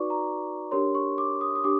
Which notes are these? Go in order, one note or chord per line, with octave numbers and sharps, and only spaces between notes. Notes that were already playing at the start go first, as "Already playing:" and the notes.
Already playing: D#4 F#4 B4 D5 C#6 D6
A#5
D4 G4 A#4 C#5 C6
C#6
D6
D#6
D#6
D4 G4 D6